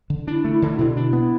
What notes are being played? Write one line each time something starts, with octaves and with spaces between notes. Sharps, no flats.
D3
D4 E4
A3
E4
D3
B2 E4
D4
B3